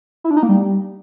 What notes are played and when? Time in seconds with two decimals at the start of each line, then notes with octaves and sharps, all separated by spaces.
0.24 E4
0.31 D4
0.37 D#4
0.43 A#3
0.49 G3